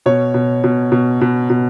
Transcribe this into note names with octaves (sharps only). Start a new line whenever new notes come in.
B2 C#5
B2
B2
B2
B2
B2